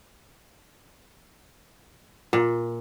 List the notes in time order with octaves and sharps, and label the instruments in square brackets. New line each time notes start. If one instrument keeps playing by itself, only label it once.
[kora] A#2